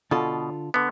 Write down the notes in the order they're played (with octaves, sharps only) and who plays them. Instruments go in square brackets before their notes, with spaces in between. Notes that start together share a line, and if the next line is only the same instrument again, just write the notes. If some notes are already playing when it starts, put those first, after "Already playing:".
[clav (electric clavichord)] B2 [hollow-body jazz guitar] D3 F4 A4
[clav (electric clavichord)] D3 B3